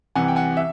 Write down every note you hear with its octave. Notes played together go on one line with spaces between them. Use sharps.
C2 C3 E3 F#5 G#5
G5
F#5 G#5
E5